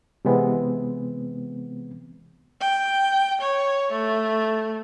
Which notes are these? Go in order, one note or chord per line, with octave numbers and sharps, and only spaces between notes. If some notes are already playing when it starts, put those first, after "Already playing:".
C3 E3 G#3 B3 C4
G5
C#5
A3